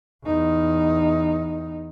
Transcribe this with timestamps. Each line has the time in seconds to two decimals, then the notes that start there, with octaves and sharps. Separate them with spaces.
0.25 E2 D#4